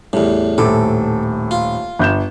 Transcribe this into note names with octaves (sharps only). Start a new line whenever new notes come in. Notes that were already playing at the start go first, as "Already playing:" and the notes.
E2 A2 G3
D#1 A2 A4 D6
F4
G1 G6 E7